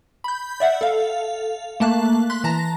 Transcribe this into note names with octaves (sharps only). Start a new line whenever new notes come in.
B5 G6
D5 E5 F#5
A4 F5
A3 A#3 A5 F#6
C6 F#6 B6
E3 A5 A#5 A#6